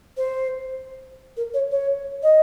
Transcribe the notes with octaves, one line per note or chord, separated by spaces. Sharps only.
C5
A#4
C#5
C#5
D#5